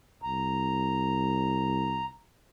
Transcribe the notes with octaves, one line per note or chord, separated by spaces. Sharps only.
C2 A#5